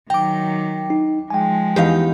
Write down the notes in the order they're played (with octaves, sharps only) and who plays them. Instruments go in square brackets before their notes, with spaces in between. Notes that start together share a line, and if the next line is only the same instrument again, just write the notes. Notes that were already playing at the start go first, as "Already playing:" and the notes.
[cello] D#3 F#3 [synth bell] G5 D6 [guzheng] A#5
[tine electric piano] D#4
[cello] F3 G#3 [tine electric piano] G5 G#5
[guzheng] E2 D#4 [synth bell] G4 F5